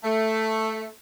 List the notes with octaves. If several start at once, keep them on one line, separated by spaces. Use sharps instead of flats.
A3